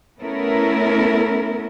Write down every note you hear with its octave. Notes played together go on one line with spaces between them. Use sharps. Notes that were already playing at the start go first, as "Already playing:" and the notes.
A3 B3 C#4 E4 A4 A#4